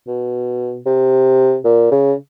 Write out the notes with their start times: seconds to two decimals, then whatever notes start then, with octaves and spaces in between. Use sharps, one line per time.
0.08 B2
0.86 C3
1.65 A#2
1.92 C#3